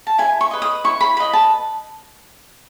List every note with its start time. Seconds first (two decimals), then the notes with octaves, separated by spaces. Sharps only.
0.07 A5
0.18 E4 G#5
0.41 C#6
0.51 B4 D#5
0.62 D#6
0.84 E4 C#6
1.01 B5
1.17 B4 D#5 B5
1.33 A5